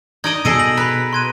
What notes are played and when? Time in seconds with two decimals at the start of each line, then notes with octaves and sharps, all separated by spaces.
0.24 D#4 D5 D#5 D#6 G#6
0.45 B2 G#4 A4 D#5 D7
0.59 A#6 F#7
0.77 B4 A#5 B5
1.13 C6 G#6 D#7